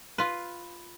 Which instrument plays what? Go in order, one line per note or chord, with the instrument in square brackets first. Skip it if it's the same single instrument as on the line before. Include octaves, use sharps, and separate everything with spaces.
[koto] F4 B4